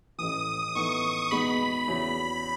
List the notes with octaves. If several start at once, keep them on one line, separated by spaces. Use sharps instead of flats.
A1 A2 E3 D#6
A2 E3 B3 D#4 C#6
E2 B2 G#3 B3 D#4 B5
E2 C#3 F#3 C#4 E4